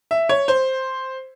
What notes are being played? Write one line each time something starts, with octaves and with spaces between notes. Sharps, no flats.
E5
C#5
C5